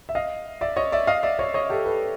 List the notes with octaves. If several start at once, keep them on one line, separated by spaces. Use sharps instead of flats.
E5
D#5 F5
D5 E5
C#5 D#5
D5 E5
D#5 F5
D5 E5
C#5 D#5
C#5 D#5
G4 A4
A4 B4